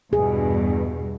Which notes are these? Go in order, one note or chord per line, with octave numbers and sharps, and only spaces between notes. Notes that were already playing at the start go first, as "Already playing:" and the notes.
E2 G2 B2 G#4